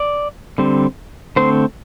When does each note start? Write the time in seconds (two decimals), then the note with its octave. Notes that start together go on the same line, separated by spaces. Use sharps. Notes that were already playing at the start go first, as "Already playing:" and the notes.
Already playing: D5
0.58 D3 G3 C4
1.36 D3 A3 C4 C5